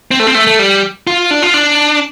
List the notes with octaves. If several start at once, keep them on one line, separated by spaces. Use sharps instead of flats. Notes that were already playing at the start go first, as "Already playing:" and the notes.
C4
A3
C4
A3
A3
G3
F4
D4
F4
D4